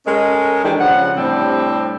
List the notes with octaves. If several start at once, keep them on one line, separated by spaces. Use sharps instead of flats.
G#3 C#4 A4 A#4 D#5
D#3 E3 D4 G4 G#4
C#3 F3 F#5
A2 C3 G3 C4 D4